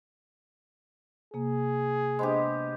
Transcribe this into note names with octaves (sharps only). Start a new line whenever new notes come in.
C3 A#3 G#4
G#3 B3 D4 G4 C5